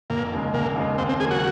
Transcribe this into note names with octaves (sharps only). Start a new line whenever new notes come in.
F1 A#3
D#2 C#3 G#3
F1 A#3
D#2 C#3 G#3
D#2 C4
C4
C#3 F#3 A#3 G#4
F#4